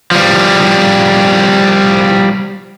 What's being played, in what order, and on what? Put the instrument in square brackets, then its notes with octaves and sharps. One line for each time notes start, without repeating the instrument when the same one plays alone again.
[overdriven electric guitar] F3 G3